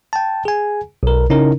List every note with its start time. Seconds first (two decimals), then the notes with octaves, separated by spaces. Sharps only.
0.13 G5 A5
0.45 G#4 G#5
1.03 B1 A#4
1.30 C#3 C#4 D#4 E4 A#4